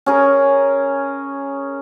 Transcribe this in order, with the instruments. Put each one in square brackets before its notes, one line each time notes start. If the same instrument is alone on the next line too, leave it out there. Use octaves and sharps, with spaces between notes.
[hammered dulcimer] C#4 G#4 A#4